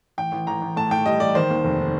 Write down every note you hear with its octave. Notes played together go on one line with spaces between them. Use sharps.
A1 G5
A1
A1 A#5
A1
A2 A5
A2 G5
G3 D#5
G3 D5
D#3 C5
D#2
F1